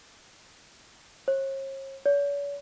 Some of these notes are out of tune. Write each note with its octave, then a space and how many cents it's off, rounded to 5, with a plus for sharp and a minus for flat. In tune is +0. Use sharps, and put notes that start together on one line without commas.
C#5 -45
C#5 +45